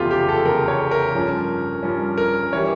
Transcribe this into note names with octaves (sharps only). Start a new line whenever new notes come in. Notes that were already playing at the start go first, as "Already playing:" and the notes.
Already playing: F1 E2 C#3 F4 G4
G4
A4
F1 E2 C#3 A#4
C#5
A#4
G2 F3 C#4
G2 F3 C#4
A#4
E3 G3 C#5